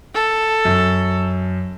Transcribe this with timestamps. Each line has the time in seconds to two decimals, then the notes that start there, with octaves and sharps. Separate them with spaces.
0.15 A4
0.65 F#2